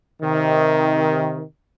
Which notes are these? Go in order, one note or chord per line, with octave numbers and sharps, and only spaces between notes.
C3 D#3